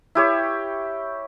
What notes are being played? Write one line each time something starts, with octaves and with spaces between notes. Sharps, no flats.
E4 G4 C#5